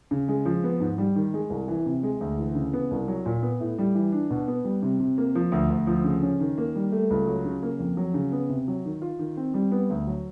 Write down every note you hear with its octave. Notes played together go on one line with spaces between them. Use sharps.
C#3
G#3
F3
B3
G#2
G3
D#3
G#3
C2
E3
C3
G#3
D2
E3
C#3
B3
C2
F#3
A#2
B3
A2
G3
E3
D4
B2
B3
G3
C3
C3
A#3
F3
D2
D2
F3
C#3
C#4
D#3
A#3
G3
A3
C#2
F#3
C#3
A#3
F2
F#3
C#3
B3
C3
F#3
D#3
F4
D#3
C4
G3
B3
D2
F#3